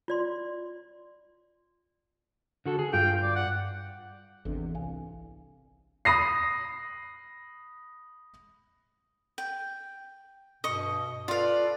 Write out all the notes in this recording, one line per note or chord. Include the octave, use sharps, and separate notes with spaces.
F4 D5 C6
D3 F#4 A4
G#4
G2 F4 G5
D5
F#5
G#1 E2 C3 E3 D4 A4
C2 F5 G#5
B5 D#6 A#6 C7
G5
G2 B2 D#5 C#6
F4 A4 B4 D5 F5